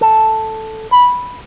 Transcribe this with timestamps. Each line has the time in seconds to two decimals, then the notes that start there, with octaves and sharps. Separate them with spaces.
0.01 A4
0.91 B5